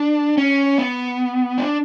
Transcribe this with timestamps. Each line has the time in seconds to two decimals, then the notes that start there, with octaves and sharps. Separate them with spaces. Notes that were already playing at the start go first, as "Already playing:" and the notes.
Already playing: D4
0.38 C#4
0.78 B3
1.58 D4